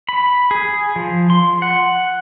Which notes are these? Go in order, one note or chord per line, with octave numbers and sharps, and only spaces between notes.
B5
G#4
F3
C6
F#5